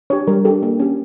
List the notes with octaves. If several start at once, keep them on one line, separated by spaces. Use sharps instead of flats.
D4 G4 C#5
G3 A#4
G4 A4
D4
A#3
C#4 G4